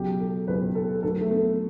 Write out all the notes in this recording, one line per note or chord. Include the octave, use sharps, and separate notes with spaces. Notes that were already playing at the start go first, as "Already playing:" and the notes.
Already playing: C#2 B2 F#3 G4
A4
C#2 B2 F#3 B4
A4
D2 D3 F#3 A4
A3
B3